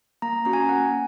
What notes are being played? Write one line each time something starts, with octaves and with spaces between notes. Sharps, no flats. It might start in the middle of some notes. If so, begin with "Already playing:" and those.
A#3 A#5
C#4 F#4 A#5
G#5
A#5
A#3 F#5